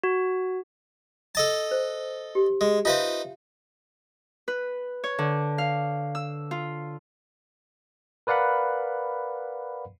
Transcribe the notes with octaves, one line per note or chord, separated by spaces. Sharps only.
F#4
A4 D#5 A5
C5
G4
G#3
D#4 F4 B4 C5 E5 F5
B4
C#5
D3
F5
E6
F4
A#4 B4 D5 F5 F#5 B5